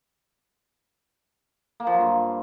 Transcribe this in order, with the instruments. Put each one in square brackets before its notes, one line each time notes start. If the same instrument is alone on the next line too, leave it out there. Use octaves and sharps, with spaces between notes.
[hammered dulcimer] A#3
F3
F#3
G2